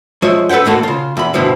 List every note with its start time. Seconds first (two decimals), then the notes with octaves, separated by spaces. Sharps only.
0.22 F3 G#3 C#5 E5
0.49 A4 B4 C5 F#5 G5
0.65 D#2 A2 A#3 F#4 A4
0.83 C#3 F4
1.17 E2 B5
1.34 G2 B2 D3 F3 E4